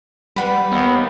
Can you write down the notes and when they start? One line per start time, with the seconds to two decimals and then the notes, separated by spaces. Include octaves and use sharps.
0.36 G3 B4 F#5 B5
0.72 D#2 B3